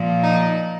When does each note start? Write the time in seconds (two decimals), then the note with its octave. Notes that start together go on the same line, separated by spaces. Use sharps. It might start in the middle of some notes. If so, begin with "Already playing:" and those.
Already playing: A#2 F3
0.23 D#4